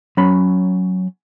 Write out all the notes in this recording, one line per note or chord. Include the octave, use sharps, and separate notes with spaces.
F#3 C#4 B5